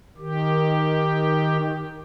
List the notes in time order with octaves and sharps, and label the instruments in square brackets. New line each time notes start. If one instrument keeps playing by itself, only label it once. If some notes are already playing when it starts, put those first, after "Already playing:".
[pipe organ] D#3 G4